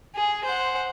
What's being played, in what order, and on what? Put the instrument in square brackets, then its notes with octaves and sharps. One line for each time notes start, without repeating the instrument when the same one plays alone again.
[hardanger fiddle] G#4
C5 F#5